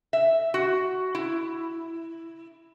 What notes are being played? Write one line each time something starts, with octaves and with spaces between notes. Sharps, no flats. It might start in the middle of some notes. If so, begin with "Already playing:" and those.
E5
F#4
E4